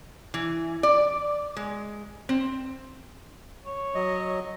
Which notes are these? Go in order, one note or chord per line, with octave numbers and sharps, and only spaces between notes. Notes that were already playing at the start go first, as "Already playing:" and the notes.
E3
D5
G#3
C4
C#5
F#3 D#5